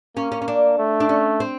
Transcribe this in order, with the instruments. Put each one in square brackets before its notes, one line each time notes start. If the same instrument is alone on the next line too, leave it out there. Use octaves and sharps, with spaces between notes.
[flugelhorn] A#3 [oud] C#4
[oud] C#4
C#4
D4
[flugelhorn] A3
[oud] D4
C#4
C4